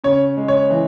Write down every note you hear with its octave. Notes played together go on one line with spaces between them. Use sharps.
C#3 C#5
G#3
C#5
E3